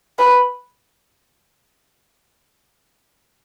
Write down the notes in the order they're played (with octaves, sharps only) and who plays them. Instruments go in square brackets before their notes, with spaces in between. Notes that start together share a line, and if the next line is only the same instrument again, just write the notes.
[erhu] B4